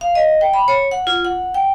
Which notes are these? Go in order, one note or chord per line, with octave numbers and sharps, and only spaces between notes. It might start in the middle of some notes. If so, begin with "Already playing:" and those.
F5
D#5
G5
B5
C#5
F#5
F4
F#5
G5